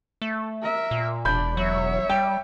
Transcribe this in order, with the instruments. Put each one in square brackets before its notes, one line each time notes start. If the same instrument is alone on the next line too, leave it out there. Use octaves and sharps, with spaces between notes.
[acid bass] A3
[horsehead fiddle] A#4 E5
[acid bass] A#2
[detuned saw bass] E1 [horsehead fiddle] D4 D5 [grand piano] B5 G6
[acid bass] F#3 [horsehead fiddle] C#5 E5
[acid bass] G3 [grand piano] G5